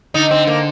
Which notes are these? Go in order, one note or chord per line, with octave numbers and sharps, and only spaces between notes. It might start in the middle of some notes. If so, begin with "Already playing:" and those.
D3 D#4
C4
A#3